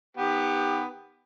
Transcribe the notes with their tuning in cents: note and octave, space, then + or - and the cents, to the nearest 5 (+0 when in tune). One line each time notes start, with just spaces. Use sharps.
D#3 +0 B3 +5 G4 +20